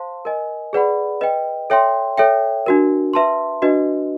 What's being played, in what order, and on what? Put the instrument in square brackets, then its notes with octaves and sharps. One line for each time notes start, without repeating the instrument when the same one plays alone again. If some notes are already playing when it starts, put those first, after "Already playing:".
Already playing: [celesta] C5 F5 A5 C6
A#4 D#5 G#5
G#4 B4 D5 F#5 B5
B4 D#5 G5
A4 C#5 E5 G5 C6
A4 C#5 E5 G5
D4 F#4 A#4
B4 E5 A5 C6
D4 F#4 B4 D#5